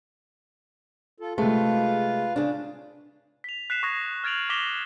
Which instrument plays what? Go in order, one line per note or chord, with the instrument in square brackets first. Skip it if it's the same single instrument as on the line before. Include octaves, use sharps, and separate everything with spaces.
[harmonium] F4 A4
[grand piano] C3 A3 [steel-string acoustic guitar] G#3 [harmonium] F4 B4 F5
[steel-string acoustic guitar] C#3 D4
[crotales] B6 F7
F#6 B6 C7 E7
C#6 D#6 G#6 A#6 B6
F6 G#6 A6 D7 F7 F#7
D6 A#6 B6 E7 F7 G7